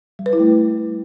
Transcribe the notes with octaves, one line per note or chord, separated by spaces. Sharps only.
G3
B4
E4
A3